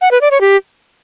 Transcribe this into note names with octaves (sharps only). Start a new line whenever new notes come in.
F#5
B4
D5
C#5
G4